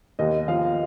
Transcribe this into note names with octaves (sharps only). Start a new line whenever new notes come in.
D#2 D#5
F3 F5